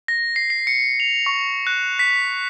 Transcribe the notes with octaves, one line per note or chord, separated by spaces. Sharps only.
A#6
C7
C7
C#7
F7
C#6
F#6
B6